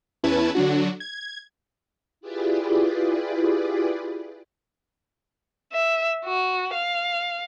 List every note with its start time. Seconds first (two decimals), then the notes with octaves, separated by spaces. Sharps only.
0.23 E2 C#4 E4 B4 A5 G#6
0.55 D3 F#3 D4 F#4
1.00 G#6
2.21 E4 F4 G4 G#4 B4 D5
5.73 E5
6.25 F#4
6.74 F5